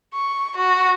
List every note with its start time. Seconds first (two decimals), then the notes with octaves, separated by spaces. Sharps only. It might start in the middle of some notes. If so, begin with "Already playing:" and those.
0.13 C#6
0.57 F#4